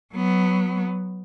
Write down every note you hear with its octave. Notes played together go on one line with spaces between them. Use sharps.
F#3 B3